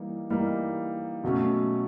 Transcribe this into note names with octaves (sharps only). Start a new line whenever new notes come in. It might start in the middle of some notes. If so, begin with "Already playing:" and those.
Already playing: E3 G3 A#3 D#4
E3 G3 A#3 D#4
B2 F#3 A3 C#4